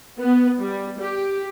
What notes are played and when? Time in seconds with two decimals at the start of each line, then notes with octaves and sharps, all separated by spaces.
0.19 B3
0.59 G3
0.99 G4